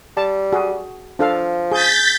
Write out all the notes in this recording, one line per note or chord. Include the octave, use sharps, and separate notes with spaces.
G3 A5
F#4 G#4
F3 D4 A4 F5
G#4 G6 A6 B6